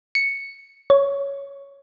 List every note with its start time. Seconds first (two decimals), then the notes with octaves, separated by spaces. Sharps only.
0.15 C#7
0.90 C#5